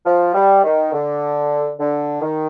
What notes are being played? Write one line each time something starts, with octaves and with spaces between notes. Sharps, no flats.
F3
G3
D#3
D3
D3
D#3